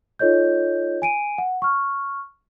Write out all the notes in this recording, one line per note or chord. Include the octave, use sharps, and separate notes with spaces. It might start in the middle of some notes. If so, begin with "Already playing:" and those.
D#4 F4 A4 C#5 D#5 G6
G#5 D7 D#7
F#5
C#6 F6